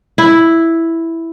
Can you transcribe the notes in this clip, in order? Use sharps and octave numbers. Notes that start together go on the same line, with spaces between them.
E4